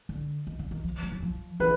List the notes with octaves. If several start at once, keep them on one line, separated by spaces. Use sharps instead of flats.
D3
D#3
D3
D#3
F3
G3
F#3
F3
E3 B4